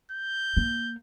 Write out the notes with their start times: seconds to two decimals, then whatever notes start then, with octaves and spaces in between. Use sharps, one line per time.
0.11 G6
0.57 A#3